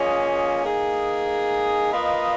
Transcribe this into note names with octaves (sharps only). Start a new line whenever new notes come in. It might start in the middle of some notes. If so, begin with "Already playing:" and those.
Already playing: F3 A#3 C#4 G#4 D#5
A#3 D#4 G#4
A#3 F4 B4 D#5